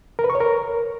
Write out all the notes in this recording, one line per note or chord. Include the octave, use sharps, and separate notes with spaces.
A#4
B4
C#6
C#5
A#4